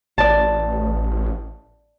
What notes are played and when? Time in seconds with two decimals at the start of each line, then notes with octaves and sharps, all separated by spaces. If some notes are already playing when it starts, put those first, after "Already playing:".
0.18 A1 D5 A5